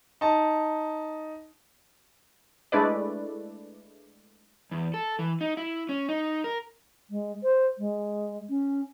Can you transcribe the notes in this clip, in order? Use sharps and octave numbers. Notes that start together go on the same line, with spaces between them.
D#4 A5
G#3 A3 D4 E4 B4 D5
E2
A4
E3
D#4
E4
C#4
D#4
A#4
G#3
C5
G#3
C#4